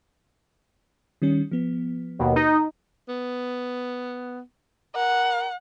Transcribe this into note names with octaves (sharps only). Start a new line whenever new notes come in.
D#3 G3 C#4
F3 B3
D#2 B2
D#4
B3
A#4 F#5